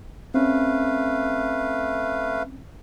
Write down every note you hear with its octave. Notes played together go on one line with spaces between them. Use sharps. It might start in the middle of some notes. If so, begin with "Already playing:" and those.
A3 C4 C#4 B4 F5